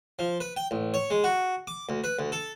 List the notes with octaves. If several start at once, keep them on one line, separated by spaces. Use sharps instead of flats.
F3
B4
G5
A1
C#5
G#3
F#4
D6
D2
B4
D2
A4